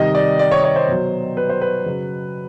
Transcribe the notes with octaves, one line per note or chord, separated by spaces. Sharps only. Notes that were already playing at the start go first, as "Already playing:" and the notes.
Already playing: C3 D#3 G3 D#5
D5
D5
C#5
C#5
C5
B2 F#3
B4
C5
B4
C#3 F#3